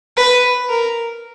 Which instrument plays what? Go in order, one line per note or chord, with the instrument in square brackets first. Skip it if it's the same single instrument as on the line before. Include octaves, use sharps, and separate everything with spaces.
[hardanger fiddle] B4
A#4